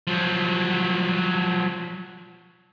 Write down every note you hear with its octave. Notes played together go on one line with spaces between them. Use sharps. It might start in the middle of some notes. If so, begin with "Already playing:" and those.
F3 F#3